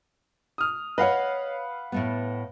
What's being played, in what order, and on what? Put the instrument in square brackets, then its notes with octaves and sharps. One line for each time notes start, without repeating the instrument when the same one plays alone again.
[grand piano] D#6 F6
[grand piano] B4 F5 F#5 [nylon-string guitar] C#5 D#5
[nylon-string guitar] A2 A3 B3